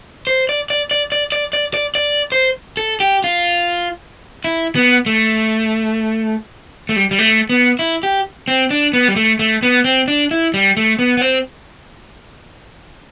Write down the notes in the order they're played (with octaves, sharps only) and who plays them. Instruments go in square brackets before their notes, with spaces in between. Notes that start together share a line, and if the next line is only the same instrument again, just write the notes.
[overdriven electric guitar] C5
D5
D5
D5
D5
D5
D5
D5
D5
C5
A4
G4
F4
E4
B3
A3
A3
G3
G3
A3
B3
E4
G4
C4
D4
B3
G3
A3
A3
B3
C4
D4
E4
G3
A3
B3
B3
C4